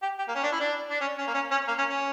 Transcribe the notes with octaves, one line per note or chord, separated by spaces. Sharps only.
G4
G4
A#3
C#4
D4
E4
D4
D4
C#4
C#4
A#3
C#4
C#4
A#3
C#4
C#4